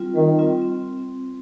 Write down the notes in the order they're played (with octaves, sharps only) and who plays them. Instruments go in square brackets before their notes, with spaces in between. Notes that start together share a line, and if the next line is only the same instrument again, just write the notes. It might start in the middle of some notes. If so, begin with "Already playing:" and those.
Already playing: [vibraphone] G3 C4 F4
[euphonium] D#3 [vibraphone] G3
[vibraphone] C4 F4
C4